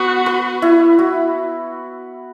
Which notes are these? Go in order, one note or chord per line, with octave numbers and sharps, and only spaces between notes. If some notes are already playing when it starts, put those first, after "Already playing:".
Already playing: B3 F#4 B4
B4
E4
F#4